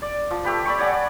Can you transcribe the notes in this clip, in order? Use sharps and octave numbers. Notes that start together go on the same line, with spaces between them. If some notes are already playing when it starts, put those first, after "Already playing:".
D5
F3
A3 G4 B4
D5 E5 B5 C#6
C#5 D5 F#5 G#5